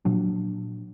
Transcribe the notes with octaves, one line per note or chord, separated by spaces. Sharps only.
A#2 F3 F#3 D4